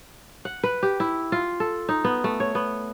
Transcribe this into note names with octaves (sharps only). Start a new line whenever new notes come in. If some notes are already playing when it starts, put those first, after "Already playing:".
F#5
B4
G4
E4
F4
A4
D#4
B3
A3
C#5
B3